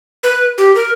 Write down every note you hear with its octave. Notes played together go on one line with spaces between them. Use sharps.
B4
G4
A#4